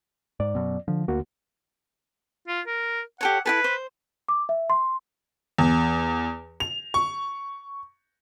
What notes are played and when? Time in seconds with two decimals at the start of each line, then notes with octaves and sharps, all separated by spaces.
0.40 G#2 D5
0.55 F#2 B2
0.88 D3 F3
1.08 D2 A#3 F#4
2.47 F4
2.66 A#4
3.21 G4 A4 C#5 F#5
3.46 E4 G#4 A4 B4
3.64 C5
4.29 D6
4.49 E5
4.70 C6
5.58 E2
6.60 F7
6.94 C#6